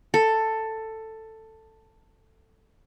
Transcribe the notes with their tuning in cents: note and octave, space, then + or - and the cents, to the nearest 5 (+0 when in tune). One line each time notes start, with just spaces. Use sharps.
A4 +10